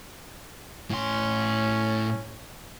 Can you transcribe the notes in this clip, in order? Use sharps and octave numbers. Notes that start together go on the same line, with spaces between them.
A2 C#4 C6